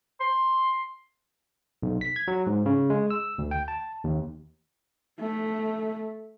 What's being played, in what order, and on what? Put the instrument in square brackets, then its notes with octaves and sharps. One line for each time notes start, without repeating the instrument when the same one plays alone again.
[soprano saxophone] C6
[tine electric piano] B1
B6
G#6
F#3
G#2
C#3
G#3
E6
D2
G5
A5
D#2
[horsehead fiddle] A3